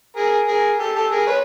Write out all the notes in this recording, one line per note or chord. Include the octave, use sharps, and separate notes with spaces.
G#4 A#4
G#4 A#4
G4 A4
G4 A4
G#4 A#4
B4 C#5